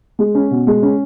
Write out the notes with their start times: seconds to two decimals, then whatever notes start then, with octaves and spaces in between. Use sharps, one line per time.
0.19 G#3
0.35 C#4
0.51 B2
0.67 G#3
0.82 C#4